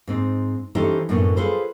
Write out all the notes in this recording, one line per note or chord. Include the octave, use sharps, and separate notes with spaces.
G#2 C4 D#4
E3 C#4 D#4 G4 A4 C5
F#2 A2 D3 A3 B3
F4 G#4 A4 B4 C5